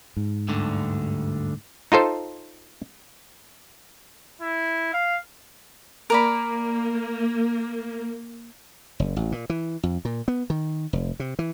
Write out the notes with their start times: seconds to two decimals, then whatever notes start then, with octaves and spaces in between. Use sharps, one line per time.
0.17 G#2
0.48 D2 G2 D3
1.92 D#4 F4 A4 C5
4.41 E4
4.93 F5
6.10 A#3 A#4 D5 B5
9.00 F#1
9.16 A1
9.32 A#2
9.50 E3
9.83 F2
10.05 A#2
10.28 B3
10.50 D#3
10.93 F1
11.20 C3
11.39 E3